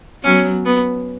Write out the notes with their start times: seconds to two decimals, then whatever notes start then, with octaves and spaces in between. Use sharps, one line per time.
0.24 F#3 B3 C#4
0.65 B3